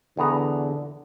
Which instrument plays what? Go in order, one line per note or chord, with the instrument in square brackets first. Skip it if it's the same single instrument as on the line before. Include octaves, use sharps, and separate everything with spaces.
[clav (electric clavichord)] E2 B3 A#5 [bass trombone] D3